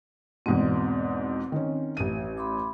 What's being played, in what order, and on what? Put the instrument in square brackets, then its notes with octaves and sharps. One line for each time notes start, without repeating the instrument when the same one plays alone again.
[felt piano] E2 G#2 B2 [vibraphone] C4
[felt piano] D#3 C#4
A1 D#7
[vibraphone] B5 C6 D6